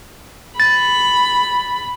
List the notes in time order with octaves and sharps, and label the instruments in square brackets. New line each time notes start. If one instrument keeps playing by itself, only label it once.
[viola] B5 [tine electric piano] A6